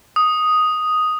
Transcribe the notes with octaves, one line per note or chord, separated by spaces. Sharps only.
D#6